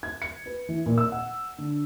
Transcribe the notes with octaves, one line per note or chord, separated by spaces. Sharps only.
G#6
C#7
B4
E3
A#2
E6
F#5
D3